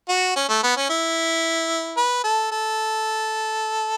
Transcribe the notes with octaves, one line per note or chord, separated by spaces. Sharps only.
F#4
C#4
A3
B3
C#4
E4
B4
A4
A4